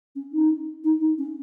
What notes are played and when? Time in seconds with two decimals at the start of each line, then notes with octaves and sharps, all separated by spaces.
0.16 C#4
0.33 D#4
0.84 D#4
1.01 D#4
1.18 C#4